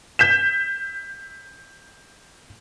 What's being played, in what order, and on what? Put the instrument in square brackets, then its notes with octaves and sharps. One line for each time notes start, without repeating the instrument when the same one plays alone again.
[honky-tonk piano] G6 B6 E7